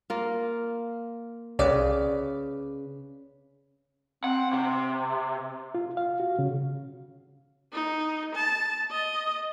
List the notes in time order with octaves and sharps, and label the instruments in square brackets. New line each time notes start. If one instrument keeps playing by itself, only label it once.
[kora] A#3 F4
[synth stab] C2 D5 [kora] C#3 B4
[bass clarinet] C4 [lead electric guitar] F#5
[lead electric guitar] C3
[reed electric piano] F4
F5
F#4
C#3
[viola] D#4
A5
D#5